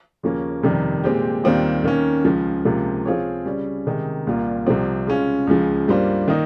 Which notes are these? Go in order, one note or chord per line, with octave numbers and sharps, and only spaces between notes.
D#2 C#3 F3 A#3 C#4
F2 C3 D#3 G3
A#2 G#3 C4 G4
D#2 D#3 G3 C4 F4
D#3 A#3 C#4
C#2 C#3 F3
C#2 C3 F3 A#3
F3 C4 F4 G#4 C#5
C#3 G3 C#4
C3 D#3 G#3 D#4
C2 A#2 G3 A#3 F4
C2 C3 F3 C4
C#3 G#3 C#4 F4
C#2 C#3 F3
G2 G3 A#3 F4 C5
D#3 A#3 D#4